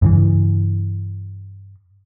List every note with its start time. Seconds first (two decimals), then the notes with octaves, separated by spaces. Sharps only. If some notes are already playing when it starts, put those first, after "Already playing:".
0.02 G2 C#3 E3